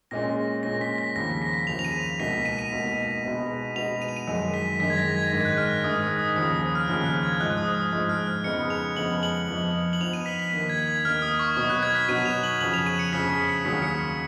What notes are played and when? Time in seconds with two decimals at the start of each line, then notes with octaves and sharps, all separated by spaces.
0.11 A#2 G#3 C#4 A#6
0.63 A#2 G#3 C#4 A#6
0.81 B6
0.98 A#6
1.16 D#2 C#3 F3 A#6
1.42 B6
1.67 D#2 C#3 F3 F7
1.79 F7
1.85 D#7
2.20 C#2 B2 A#3 D#4 B6
2.45 D#7
2.59 D#7
2.71 C#2 B2 A#3 D#4
3.24 B2 G#3 B3 D#4
3.75 B2 G#3 B3 D#4 F7
4.02 D#7
4.09 F7
4.17 D#7
4.27 F#2 D#3 G#3
4.54 B6
4.80 F#2 D#3 G#3 B6
4.90 G#6
4.97 A#6
5.15 G#6
5.32 G#2 D#3 G#3 G#6
5.45 F#6
5.57 F6
5.84 G#2 D#3 G#3 D#6
6.01 F6
6.19 D#6
6.36 D#2 C#3 F3 D#6
6.49 D#6
6.62 D#6
6.75 F6
6.88 D#2 C#3 F3 F6
7.06 F#6
7.23 G#6
7.40 G#2 F3 G#3 F#6
7.57 D#6
7.74 D#6
7.92 G#2 F3 G#3 D#6
8.09 F6
8.27 F6
8.44 F2 C#3 G#3 B3 D#4 C#7
8.70 F7
8.96 F2 C#3 G#3 B3 D#4 F#7
9.23 F#7
9.48 F2 F3 B3 D#4
9.93 F#7
10.00 F2 F3 B3 D#4 F7
10.13 D#7
10.26 B6
10.39 B6
10.52 D#2 D#3 A#3
10.69 G#6
10.88 G#6
11.05 D#2 D#3 A#3 F6
11.22 D#6
11.39 C#6
11.56 B2 F#3 B3 D#4 D#6
11.70 F#6
11.83 G#6
11.95 B6
12.09 B2 F#3 B3 D#4 D#7
12.26 F7
12.43 F#7
12.61 F2 C#3 F3 F#7
12.74 F7
12.86 D#7
12.99 C#7
13.13 F2 C#3 F3 B6
13.30 B6
13.47 C#7
13.65 D#2 C#3 F#3 C#4 B6
13.82 C#7
13.99 B6